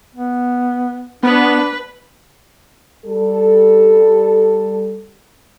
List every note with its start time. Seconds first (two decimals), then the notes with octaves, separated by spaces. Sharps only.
0.15 B3
1.23 B3 D4 B4
3.06 G3 A4